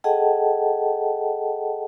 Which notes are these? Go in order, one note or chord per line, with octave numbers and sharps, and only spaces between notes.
G#4 A4 D#5 F#5 G5 A5